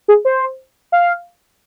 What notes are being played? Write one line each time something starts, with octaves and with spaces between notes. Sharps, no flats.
G#4
C5
F5